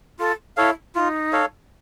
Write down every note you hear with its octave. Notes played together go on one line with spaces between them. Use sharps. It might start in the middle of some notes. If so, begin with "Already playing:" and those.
F4 A4
E4 A4 C#5 F5
D#4 E4 F4
A4 C#5 F5